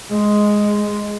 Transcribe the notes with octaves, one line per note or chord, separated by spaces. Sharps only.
G#3